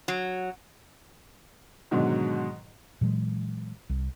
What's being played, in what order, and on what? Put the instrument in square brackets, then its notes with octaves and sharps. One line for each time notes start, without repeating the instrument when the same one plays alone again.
[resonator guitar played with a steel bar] F#3
[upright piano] G#2 B2 D3 D#3 F#3
[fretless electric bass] A#2 E3 F#3 G#3
C2